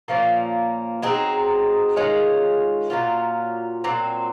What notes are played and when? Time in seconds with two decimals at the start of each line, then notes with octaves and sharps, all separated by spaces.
0.08 A#2 F3 A#3 C#4
1.02 F#3 C4 D#4 G#4
1.96 D#3 G#3 C#4 F4
2.90 A#2 F#3 C#4 F4
3.84 A#2 F#3 C4